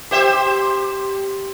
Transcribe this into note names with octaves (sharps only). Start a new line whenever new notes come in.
G4 C5 E5